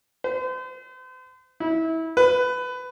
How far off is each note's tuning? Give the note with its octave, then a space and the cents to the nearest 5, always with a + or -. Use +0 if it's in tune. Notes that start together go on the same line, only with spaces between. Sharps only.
C5 -40
E4 -25
B4 +20